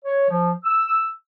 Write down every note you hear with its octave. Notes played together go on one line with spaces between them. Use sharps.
C#5
F3
E6